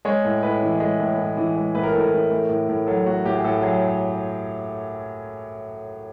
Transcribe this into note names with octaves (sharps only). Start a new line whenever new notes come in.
G#3 C#5
A2
A2 B4
E3
G#3
A2
A2
E3
G#3
A2 B4
A#4
A2 A4
A#4
E3
A3
A2
A2
F#3 A4
A3 F#4
A2 G4
G#4
A2 A4
F#3 G#4